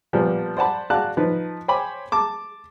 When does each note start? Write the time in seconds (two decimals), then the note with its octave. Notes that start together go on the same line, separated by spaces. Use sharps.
0.13 A#2 F3 G3 B3
0.57 C5 D5 F#5 A5 B5
0.90 F#4 D5 F5 A5 F#6
1.17 F3 D#4 B4
1.68 C5 C#5 G5 G#5 B5 D6
2.12 A5 D6